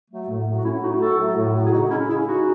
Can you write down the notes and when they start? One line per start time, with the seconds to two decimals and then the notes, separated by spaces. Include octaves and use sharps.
0.11 F#3 A3
0.28 A2
0.47 F#3 A3
0.57 F#4
0.64 A2 C#4 E4
0.83 F#3 A3 D#4 F#4
1.01 A2 F#4 A4
1.19 F#3 A3
1.37 A2
1.55 F#3 A3
1.66 G#4
1.72 C#3 D#4 F#4
1.90 G#3 C#4 E4
2.08 C#3 E4 G#4
2.27 G#3 D#4 F#4